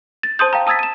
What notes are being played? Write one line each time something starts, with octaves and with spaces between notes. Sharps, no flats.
A6
C5 A5 C6 D#6 G6
F5 G5 A#5
A5 D#6 E6 G#6 A6 B6
D#7 E7